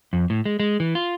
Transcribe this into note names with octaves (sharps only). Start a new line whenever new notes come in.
F2
A2
G#3
G#3
E3
F4